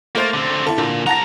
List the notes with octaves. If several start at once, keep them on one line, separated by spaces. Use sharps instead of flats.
A3 A#3 C5 A6
D3 C4
E4 A4
A#2 D3
C2 F#5 A5 A#5 A#6